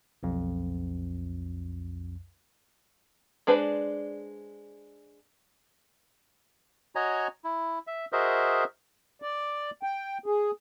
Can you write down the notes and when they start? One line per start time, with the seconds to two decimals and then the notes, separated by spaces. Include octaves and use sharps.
0.23 B1 F2
3.47 G#3 D4 B4 C5 D5
6.95 F#4 C#5 D#5 G#5 A#5
7.44 E4
7.87 E5
8.13 F#4 G#4 A#4 C5 D#5 E5
9.22 D5
9.83 G5
10.26 G#4